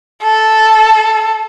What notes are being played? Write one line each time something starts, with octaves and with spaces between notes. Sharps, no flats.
A4